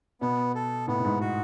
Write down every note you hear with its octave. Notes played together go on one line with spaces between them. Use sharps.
B2 B3
A4
A2 B3
A2
G#2
F#4